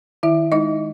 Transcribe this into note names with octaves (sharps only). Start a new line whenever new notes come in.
D#3 E4 E5
G#3 D#4 D#5